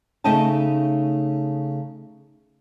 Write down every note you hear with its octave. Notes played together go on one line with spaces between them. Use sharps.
C#3 A3 D#4 D#5 G5 A5